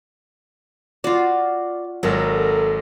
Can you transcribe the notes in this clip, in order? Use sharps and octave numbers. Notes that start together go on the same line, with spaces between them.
F4 F#4 D5
G#1 F#3 A4 A#4